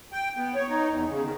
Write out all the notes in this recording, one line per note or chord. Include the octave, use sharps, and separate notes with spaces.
G5
B3
C#5
D#4
E2
C#3
D#3